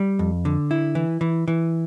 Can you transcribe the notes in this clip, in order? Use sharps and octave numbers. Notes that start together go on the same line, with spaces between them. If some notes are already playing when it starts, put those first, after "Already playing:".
Already playing: G3
F2
D3
E4
E3
E3
E3